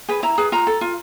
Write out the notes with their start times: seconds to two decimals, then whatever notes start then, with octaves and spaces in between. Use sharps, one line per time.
0.09 G#4 B4
0.23 E4 A#5
0.38 G#4 B4
0.52 F4 A#5
0.67 A4
0.81 F4